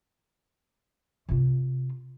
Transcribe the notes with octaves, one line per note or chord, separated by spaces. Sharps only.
C3 F4